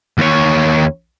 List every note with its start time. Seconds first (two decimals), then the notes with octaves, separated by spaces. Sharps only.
0.18 D#2 C#5